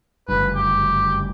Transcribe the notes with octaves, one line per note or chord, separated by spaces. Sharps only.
F#1 D2 G2 B4
G4